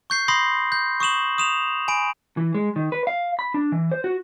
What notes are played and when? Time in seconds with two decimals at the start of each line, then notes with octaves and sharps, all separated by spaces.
0.10 C#6 G6 C7
0.28 B5 C6 D#6 A#6 C7
0.72 G6
1.00 C#6 D#6 E7 F#7
1.38 D#6 E7 F7
1.88 G#5 B5 D7
2.37 E3
2.55 G#3
2.76 D#3
2.92 B4
3.07 F5
3.39 B5
3.54 D4
3.72 E3
3.92 C5
4.04 F#4